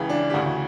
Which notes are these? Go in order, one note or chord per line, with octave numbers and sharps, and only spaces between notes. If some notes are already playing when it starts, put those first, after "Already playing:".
Already playing: C#2 C#3 E3
D4
G4
D2 C#3 E3 F#4